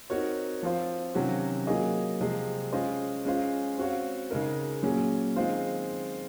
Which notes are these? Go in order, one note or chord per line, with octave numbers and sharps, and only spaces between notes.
C4 D#4 F#4 A#4 C#5
F3 C4 F4 C5
C3 D#3 F#3 C#4 F#4
F#3 A#3 F4 G#4 D#5
C3 F3 G#3 C4
G#3 C#4 F4 C5 D#5
G#3 C#4 F4 C5
C4 F#4 C#5 F5
C#3 G#3 D#4 A#4
A#2 F#3 C#4 G#4
D#3 G#3 C4 F4 C5